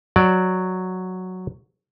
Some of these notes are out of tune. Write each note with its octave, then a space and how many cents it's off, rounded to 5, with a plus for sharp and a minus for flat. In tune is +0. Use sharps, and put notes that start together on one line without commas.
F#3 -5 D5 +5